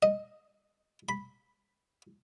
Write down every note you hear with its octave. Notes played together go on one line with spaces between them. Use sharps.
D#5
B5